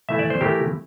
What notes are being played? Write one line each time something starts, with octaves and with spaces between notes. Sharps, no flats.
E3 A3 E4 E5
D5
C5
E3 A3 E4 G4 A#4